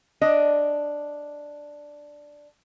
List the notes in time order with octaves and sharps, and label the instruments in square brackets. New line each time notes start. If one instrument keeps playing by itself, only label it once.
[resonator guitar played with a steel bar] D4 D#5